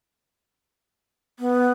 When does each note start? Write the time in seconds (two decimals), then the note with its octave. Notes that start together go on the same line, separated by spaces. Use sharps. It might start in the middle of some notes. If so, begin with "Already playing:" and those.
1.39 B3